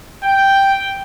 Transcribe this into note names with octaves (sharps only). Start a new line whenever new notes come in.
G5